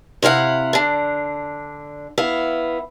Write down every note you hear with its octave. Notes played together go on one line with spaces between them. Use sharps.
C3 E4 F5 F#5
D3 D4
B3 E4 F5